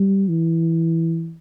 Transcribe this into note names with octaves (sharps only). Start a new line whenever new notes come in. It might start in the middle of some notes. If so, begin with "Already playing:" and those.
Already playing: G3
E3